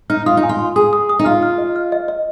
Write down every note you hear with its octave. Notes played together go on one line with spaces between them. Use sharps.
D#4 F6
F4 D#6
D#4
G#5
F4
C6
G#4 D#6
D#6
D#6
D#4
F4 F6
F6
D#5
F6
D#5
D#5